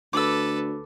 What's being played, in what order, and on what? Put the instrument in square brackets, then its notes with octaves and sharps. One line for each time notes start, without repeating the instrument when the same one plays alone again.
[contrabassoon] D2 [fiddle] A4 B4 [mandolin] D6 E6